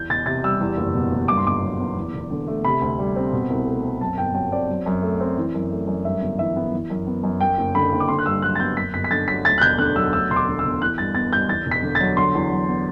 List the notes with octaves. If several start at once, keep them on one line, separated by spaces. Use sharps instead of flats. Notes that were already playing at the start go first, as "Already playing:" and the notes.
Already playing: E2 G6
E1 A6
C3 A6
G3 E6
E2
F#1
B2
F#1
G2 D6
C6
G1 D6
F#3
B3
E2
E1
D3
A3
C3 B5
D2
G3
C4
B2
C2
A3
C4
F#2 A5
G1 G5
F#3 G5
C4 D5
F#3
F#2
A3
C4
E3
F#2
A3
F#2
G2 E5
G1
E3 E5
B3
E3
F#2
B3
F#2
F#2 G5
F#1
D3 B5
F#1
D6
D3 C6
F#6
G2 E6
F#3 F#6
A6
B3 G6
F#2 B6
G1 B6
B6
D3 A6
F#3 B6
D2 A6
F#6
E1 G6
D3 F#6
F#3 E6
D2 E6
E1 C6
D6
D3
E6
E1
E3 F#6
G2 A6
B3 A6
G2 G6
E2 A6
E1
B6
D3
A6
F#3
D3 C6
E2
F#3
B3